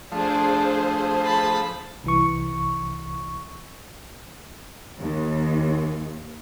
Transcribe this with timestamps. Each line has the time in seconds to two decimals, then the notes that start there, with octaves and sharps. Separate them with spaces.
0.12 F3 A3 D4 G#4 C5
1.25 A5 B5
2.04 C2 E3 C#6
5.00 D#2